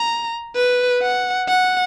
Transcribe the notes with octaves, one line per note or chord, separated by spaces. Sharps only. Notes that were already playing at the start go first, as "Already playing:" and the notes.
Already playing: A#5
B4
F#5
F#5